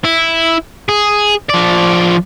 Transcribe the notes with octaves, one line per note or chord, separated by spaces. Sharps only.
E4
G#4
F3 D5